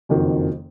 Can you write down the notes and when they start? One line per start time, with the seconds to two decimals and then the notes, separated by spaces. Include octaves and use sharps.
0.09 F#1 F2 D#3 F#3